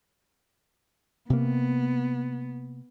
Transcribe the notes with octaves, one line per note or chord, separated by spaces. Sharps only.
C3 A#3 B3